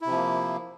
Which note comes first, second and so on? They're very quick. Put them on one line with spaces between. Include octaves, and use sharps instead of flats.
E4 C3 F3 A#3